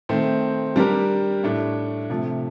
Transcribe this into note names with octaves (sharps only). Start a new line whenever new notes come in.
D#3 A3 C4
G3 D4 G4 A#4
A2 A3 D4
C3 F3 A3